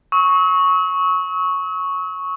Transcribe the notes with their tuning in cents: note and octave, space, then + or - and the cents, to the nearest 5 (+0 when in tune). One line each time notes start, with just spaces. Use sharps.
C#6 +0 E6 -45